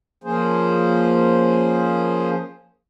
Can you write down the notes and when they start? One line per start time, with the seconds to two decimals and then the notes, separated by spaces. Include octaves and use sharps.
0.24 F3 A#3 C#4 G#4 C5